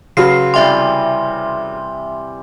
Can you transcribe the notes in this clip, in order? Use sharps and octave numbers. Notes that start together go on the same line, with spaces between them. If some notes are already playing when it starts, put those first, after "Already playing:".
C#3 F#3 B4 F5 C6 C7
C3 E3 G3 E5 C6